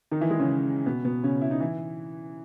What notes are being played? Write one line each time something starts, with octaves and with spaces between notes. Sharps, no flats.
D#3 D#4
E3 E4
G#3 G#4
C#3 C#4
B2 B3
B2 B3
C#3 C#4
E4
D#4
E3 E4